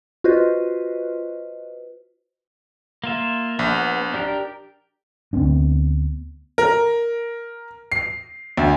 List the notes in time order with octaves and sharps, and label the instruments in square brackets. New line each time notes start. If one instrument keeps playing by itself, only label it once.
[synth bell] F4 F#4 B4 C5 D#5
[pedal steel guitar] A#3 F4 E5
[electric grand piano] A#1 [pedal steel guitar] B3
[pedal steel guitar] D4 G4 A#4
[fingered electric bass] D2 B3 C4 D4
[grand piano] A#4
C7
D2